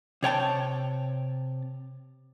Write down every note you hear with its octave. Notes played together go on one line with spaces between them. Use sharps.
C3 C#5 G5 A5